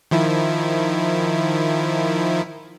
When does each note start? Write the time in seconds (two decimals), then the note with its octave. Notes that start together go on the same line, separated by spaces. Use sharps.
0.11 D#3 F3 E4